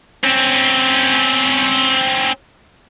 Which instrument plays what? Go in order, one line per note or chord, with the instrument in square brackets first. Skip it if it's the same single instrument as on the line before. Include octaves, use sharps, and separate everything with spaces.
[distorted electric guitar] C4 C#4